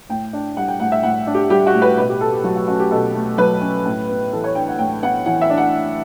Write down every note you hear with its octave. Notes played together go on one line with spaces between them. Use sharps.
A2 G5
D4
G3 F#5
G5
A2 F#5
E5
A2 F#5
D4
G4
G3 G4
F#4
A2
B4
B2 B4
G4
A3 A4
G4
F#3 F#4
F#4
C#4 F#4
G4
B2 A4
A3
F#3 B4
C#4
A2
B3
E3 A4
C#5
D4 G5
F#5
A2 G5
B3 F#5
E3 F#5
E5
D4
F#5